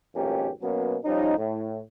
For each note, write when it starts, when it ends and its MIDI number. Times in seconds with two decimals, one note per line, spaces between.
0.15 0.49 32
0.15 0.49 41
0.15 0.49 47
0.15 0.49 58
0.15 0.49 61
0.15 0.49 67
0.62 0.96 47
0.62 0.96 54
0.62 0.96 58
0.62 0.96 59
0.62 0.96 61
1.05 1.37 53
1.05 1.37 55
1.05 1.37 61
1.05 1.37 63
1.38 1.80 45